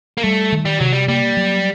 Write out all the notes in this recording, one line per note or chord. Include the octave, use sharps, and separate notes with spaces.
A#3
G3 A3
D#3
G3
C3 F#3
G3
G3 A#3
F#3